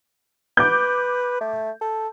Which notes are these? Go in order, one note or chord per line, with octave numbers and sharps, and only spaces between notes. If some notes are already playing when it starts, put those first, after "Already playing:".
B4 D6 G6
A3
A4